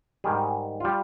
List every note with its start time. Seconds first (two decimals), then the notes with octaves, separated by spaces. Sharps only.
0.24 G#2 D#3 G3 G#4
0.80 G3 F4